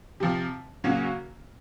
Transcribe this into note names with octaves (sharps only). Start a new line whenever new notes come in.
C3 F3 C4
C#3 F#3 A#3 C#4 F#4